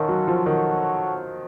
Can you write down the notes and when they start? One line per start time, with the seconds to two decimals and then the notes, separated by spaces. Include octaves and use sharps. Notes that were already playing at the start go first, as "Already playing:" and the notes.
Already playing: D#3 C#4 F4 A4 C#5 F#5
0.08 F#3
0.28 F3
0.45 D#3 F#4 A4 C#5 F#5